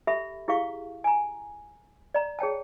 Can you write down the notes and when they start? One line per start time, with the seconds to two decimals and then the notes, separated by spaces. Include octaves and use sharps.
0.07 G4 A4 E5 B5
0.48 E4 G4 G#4 F5 C#6
1.04 G#5 A#5
2.14 D5 A#5
2.39 G#4 C#5 G5 A5